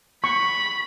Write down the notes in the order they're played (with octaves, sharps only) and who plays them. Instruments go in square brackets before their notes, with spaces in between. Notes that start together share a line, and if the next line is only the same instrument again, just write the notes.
[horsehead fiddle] B5 [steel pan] C#6